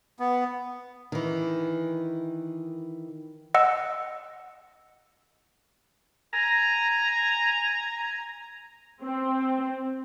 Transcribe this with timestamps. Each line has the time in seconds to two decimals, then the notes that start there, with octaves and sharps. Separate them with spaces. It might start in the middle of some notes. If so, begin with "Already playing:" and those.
0.20 B3
1.12 D#3 E3
3.54 D#5 F#5 E6
6.34 G#5 A#5
9.03 C4